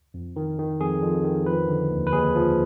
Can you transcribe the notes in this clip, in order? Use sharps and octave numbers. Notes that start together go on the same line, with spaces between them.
F2
D#3
D#3
F2 G#4
F2
D#3
F3 B4
D3
D#2
B4
D#2 G#4
F3